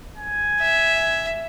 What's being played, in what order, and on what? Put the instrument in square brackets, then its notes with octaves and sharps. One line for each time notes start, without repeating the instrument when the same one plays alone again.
[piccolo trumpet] G#5
[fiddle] E5